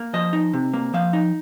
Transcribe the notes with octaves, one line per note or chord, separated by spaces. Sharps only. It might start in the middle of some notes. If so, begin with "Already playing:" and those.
Already playing: A#3
F3 D#5
D#4
C3
A#3
F3 F5
D#4